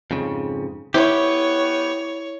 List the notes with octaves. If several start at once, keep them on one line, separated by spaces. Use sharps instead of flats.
F2 G#2 C#3
B3 E4 G4 C#5